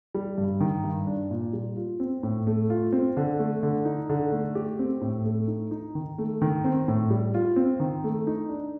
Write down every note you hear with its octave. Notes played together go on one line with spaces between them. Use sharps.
G3
G2
D#3
G2
D4
A#2
G3
F4
C4
A2
A3
F4
C4
D3
A3
D3
D#4
D3
A3
G4
C4
A2
A3
D#4
D#4
D#3
A3
D#3
C4
A2
G3
F4
C4
D#3
A3
D#4
D4